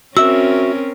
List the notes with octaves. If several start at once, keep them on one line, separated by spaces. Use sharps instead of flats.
C4 C#4 F#4 A#4 E5 E6